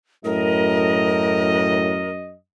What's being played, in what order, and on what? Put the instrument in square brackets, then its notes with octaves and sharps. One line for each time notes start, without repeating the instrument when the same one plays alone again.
[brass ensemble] F#2 D#5 [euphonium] A2 [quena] A#4